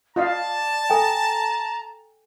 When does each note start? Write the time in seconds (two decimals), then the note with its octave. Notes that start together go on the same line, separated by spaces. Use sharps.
0.16 F4 D5 D#5 F5 A5
0.90 A4 G5 G#5 A#5